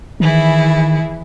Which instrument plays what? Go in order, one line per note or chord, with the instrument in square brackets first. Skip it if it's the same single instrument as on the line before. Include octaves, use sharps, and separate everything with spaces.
[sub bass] D#3 [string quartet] E3 E4 G#4